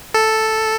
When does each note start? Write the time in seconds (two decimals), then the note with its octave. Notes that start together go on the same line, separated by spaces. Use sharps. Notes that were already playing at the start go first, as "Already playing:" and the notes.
0.14 A4